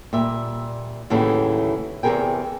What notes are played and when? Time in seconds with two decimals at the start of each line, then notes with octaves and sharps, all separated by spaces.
0.13 A#2 G3 E5
1.10 D#2 A2 C#3 E3 F#3 A3
2.03 E2 C3 A3 G#4 A#4 G5